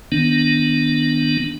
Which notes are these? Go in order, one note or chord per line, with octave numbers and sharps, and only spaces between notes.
D#3 B3 D4